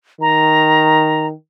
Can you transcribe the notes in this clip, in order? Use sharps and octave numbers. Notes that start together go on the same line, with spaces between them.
D#3 A#5